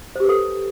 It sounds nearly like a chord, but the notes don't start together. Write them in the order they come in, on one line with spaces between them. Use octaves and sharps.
C5 G4 B4 A4